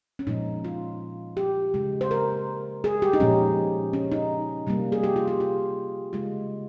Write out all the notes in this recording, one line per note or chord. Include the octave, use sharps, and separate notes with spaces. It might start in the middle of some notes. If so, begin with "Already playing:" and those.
C#4
A#2 F3 G#3 D#4
F4
G4
C#3 G#3
C5
A#4
G#4
G4
D#4
A#2 F3 G#3 C#4
C#4
D#4
C3 G3 A#3
G#4
G4
F4
G4
F4
C#3 G#3 F4